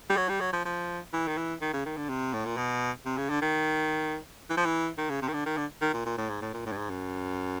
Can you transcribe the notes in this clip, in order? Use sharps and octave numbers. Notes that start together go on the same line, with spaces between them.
G3
F#3
G3
F#3
F3
F3
E3
D#3
E3
D#3
C#3
D#3
D3
C3
A2
A#2
B2
C3
C#3
D3
D#3
E3
F3
E3
D#3
C#3
C3
D#3
D3
D#3
D3
D#3
A#2
A#2
A2
G#2
A2
A#2
A2
G2
G#2
F#2